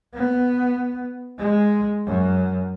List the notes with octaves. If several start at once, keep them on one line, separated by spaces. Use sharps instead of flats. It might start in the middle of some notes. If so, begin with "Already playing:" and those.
B3
G#3
F#2